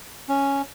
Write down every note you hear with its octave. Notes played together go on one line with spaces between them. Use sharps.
C#4